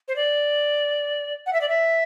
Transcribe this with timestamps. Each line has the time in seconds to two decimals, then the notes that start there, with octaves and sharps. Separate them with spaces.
0.08 C5
0.16 D5
1.46 F#5
1.53 E5
1.61 D5
1.69 E5